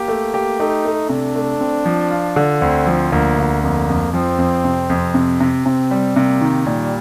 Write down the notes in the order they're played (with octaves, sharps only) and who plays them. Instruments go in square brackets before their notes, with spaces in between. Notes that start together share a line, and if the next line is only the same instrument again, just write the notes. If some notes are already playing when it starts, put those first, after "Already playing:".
Already playing: [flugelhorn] A#3 [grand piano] G4
[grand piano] A3
G4
[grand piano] A3 [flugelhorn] D#4
[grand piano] A3
[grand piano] C3 [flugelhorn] D4
[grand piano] A3
C4
F3
F4
D3
[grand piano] D2 [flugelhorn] C4
[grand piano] F3
[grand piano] D2 [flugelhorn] A#3
[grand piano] D2
[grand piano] F2 [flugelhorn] A#3
[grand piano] F2
[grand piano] F3 [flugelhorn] C4
[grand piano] F2
C3
F2
C3
C3
[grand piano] C3 [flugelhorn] C4
[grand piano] G3
[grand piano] C3 [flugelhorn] A#3
[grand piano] D#3
[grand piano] A#2 [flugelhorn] G3